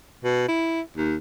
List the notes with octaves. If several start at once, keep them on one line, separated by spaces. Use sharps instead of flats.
B2
E4
D#2